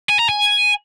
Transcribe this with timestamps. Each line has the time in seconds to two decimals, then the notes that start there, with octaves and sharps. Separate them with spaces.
0.09 G#5
0.19 A#5
0.29 G#5